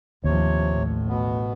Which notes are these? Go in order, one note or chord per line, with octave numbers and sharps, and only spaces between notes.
A1 D#2 C3 F3 C#5
A1 A2
B2 B3